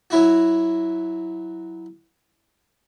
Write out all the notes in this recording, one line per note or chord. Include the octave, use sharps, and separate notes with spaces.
F#3 E4 F#4